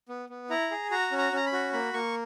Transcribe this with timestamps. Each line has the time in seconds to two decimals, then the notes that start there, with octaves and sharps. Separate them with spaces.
0.09 B3
0.29 B3
0.50 E4 A#5
0.71 G#4
0.91 F#4 A#5
1.11 C#4
1.18 A#5
1.32 C#4 A#5
1.46 B5
1.53 F#4
1.73 A#3 B5
1.93 A#3 C#6